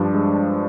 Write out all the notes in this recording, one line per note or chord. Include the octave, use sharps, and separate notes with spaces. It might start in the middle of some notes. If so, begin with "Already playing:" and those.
Already playing: G2 F3 D4
G#3